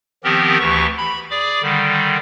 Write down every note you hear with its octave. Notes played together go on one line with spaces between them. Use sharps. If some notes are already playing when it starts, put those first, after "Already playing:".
D#3 F3 B3 C4 G4 A#4
D2 E3 G4 C#6
B5
G#4 D5 D6
D3 D#3 G3